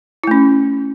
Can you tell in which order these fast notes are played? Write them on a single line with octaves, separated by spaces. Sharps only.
E4 A3 C#4